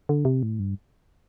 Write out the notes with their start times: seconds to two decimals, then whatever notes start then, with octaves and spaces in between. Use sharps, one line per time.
0.09 D3
0.25 C3
0.43 A2
0.60 G2